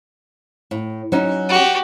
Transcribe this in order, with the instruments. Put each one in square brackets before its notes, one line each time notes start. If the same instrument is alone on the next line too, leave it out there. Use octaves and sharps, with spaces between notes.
[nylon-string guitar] A2
F#3 C#4 D#4
[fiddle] F#4 G4